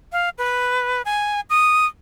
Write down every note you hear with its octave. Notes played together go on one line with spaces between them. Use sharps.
F5
B4
G#5
D#6